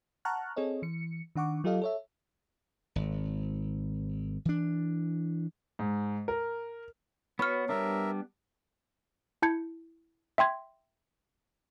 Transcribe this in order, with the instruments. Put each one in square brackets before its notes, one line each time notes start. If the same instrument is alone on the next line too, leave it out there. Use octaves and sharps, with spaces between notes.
[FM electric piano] F#5 A5 A#5 C#6 F6 F#6
C4 G#4 A4 C#5 D#5
E3 C#7
D#3 D4 F#5 C#6 D6
F#3 F4 G4 A4 D#5 F5
A4 C#5 E5
[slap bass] G#1
E3 D4
[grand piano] G#2
A#4
[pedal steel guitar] B3 F#4 [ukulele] C#5 [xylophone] B5 F6
[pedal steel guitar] G3 B3 D4 [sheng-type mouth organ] A#4 E5
[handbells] E4 A5 G6 G#6 C#7
E5 G5 C6 G#6